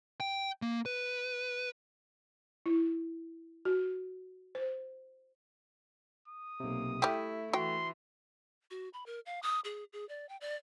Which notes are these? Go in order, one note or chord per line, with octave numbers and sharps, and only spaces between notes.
G5
A#3
B4
E4
F#4
C5
D#6
B1 C3 A#3
G3 A3 E4 G4
E3 F#4 G5 C6
F#4
B5
A#4
F5
D#6
G#4
G#4
D5
G5
D5